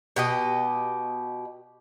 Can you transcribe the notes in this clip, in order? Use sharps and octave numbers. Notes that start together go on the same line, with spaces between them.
B2 G4 D#5